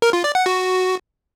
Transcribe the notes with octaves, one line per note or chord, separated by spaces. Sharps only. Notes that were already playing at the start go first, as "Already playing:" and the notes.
A#4
F4
D5
F#5
F#4